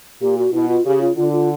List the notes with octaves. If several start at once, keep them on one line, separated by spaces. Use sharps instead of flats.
A#2 G4
F#4
B2 E4
F4
C#3 G4
F4
D3 F4
F4